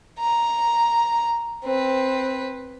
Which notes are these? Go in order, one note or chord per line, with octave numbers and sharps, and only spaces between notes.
A#5
C4 B4